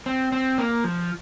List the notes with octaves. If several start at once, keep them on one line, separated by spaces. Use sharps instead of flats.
C4
C4
A#3
F3